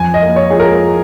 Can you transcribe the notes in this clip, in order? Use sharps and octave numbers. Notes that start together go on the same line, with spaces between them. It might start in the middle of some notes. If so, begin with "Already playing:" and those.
Already playing: F2 G#5
D#5
A#3
C#5
F3 G#4
A#4